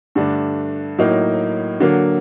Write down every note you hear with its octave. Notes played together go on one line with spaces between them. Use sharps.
G2 D3 A3 D4
A2 F#3 A#3 D#4
D3 F#3 A#3